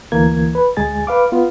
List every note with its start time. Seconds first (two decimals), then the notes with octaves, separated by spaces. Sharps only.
0.12 D2 E3 A#3 G#6
0.55 B4
0.77 D2 G#3 G#4 G#5 A6
1.07 B4 F5 D6
1.32 B3 F4